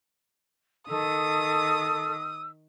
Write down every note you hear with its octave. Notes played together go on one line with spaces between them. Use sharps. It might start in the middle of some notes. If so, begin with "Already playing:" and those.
D#3 A4 D#6 E6